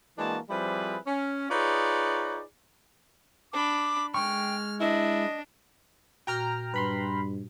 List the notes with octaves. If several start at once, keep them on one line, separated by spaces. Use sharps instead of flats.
E3 G#3 A#3 D4 F#4 A5
F3 G3 C4 E4 G#4 B4
C#4
D#4 F4 G#4 B4 C#5 D5
D4 B5 D6
G#3 G5 C#6 F6
D4 E4 D#5
A#2 F#4 G5 A#5 F6
G2 B4 B5 C6